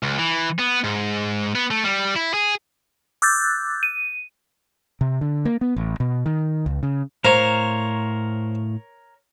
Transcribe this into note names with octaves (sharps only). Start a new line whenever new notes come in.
C#2
E3
B3
G#2
B3
A3
G3
E4
G#4
D6 E6 F#6 G6 A6
D#7
C3
D3
A#3
B3
A1
B2
D#3
C#2
C#3
A2 A#4 C5 C#5 F5 A#5